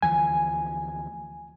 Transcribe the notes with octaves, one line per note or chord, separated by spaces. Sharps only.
D2 E3 F3 G#5